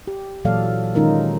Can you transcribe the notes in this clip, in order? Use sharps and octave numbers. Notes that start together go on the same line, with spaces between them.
G4
A#2 E3 F#3 A4 D5 F5
D#3 G#3 C#4 D#4 F4 A#4